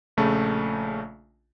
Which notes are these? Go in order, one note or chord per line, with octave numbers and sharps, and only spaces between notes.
A#1 C#3 A3 A5